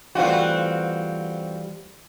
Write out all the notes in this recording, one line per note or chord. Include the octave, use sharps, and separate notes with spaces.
E3 G3 A3 C4 F4 F#4